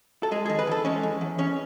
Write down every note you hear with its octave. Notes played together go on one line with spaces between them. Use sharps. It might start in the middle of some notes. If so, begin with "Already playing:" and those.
A4
G#3 G#4
D#3 G#4
B4
E2 A4
G#3 C#4
E2
E2
E2 C#4